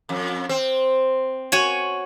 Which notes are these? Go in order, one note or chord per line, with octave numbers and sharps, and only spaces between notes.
F2
C4
F#4 C#5 G#5